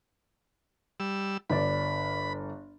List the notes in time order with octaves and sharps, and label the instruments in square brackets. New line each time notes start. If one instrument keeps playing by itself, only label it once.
[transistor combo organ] G3 E6
[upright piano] G1 D5 [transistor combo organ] B5